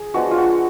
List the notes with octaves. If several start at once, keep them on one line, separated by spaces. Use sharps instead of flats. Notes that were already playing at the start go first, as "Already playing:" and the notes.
Already playing: G#4
F3 G#3 B3 D4 F#4
F4
F#4